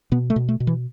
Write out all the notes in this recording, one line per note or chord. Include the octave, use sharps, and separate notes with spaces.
B2 B3
A3
B2
A3
B2
E3